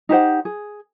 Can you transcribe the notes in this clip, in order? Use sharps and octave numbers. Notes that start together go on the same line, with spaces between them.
D#4 G4 C5 F#5
G#4